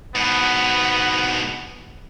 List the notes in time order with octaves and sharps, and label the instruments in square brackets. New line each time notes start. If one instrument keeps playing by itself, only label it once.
[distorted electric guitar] G#2 B2 [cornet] B3